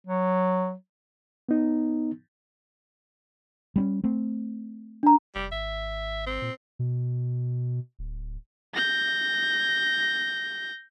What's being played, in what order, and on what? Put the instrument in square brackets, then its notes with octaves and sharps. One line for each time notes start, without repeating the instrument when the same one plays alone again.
[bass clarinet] F#3
[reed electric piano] B3 D#4
[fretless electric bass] G3 C4 C#4
A3 C4
[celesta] D4 A#5
[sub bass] F1 [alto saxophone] G3
[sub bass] G#1 [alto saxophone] E5
[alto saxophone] C4
[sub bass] A#2
B2
D1
[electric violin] G6 A#6